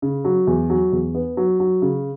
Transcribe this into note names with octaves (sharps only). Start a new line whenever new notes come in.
C#3
F#3
E2
F#3
E2
B3
F#3
F#3
C#3